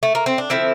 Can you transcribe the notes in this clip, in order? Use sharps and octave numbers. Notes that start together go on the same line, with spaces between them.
A3
A#3
C4
D4
D3 F3 A3 C4 E4